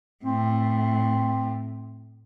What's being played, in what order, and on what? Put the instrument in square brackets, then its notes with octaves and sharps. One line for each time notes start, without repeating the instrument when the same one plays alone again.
[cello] A2 [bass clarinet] C4